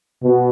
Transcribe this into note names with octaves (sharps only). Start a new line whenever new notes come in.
B2